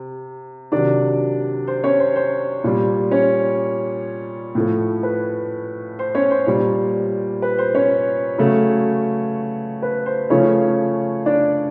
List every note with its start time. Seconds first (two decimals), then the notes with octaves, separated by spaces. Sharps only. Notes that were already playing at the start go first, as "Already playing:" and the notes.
Already playing: C3
0.72 C3 D#3 F#3 D4 D5
1.67 C5
1.84 C#4 C#5
2.00 C5
2.16 C5
2.64 A#2 G3
3.11 C#4 C#5
4.55 A2 F3 A3
5.03 B4
5.99 C5
6.15 C#4 C#5
6.31 C5
6.47 A#2 G3
7.42 B4
7.58 C5
7.75 C#4 C#5
8.38 C#3 F#3 A3
9.82 B4
10.06 C5
10.30 C#3 F3 A3 C#4 C#5
11.26 D4 D5